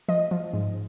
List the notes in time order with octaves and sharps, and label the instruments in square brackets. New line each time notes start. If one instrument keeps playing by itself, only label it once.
[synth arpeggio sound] F3 D#5
F3
G#2